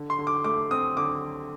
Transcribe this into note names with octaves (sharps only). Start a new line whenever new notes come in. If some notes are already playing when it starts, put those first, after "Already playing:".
Already playing: D3
C6
D3
D6
A3 D6
C4 D#6
D3 D6